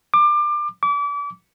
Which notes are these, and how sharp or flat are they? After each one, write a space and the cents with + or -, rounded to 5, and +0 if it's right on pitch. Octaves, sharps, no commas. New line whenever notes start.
D6 +25
D6 -35